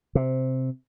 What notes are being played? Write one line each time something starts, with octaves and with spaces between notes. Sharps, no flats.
C3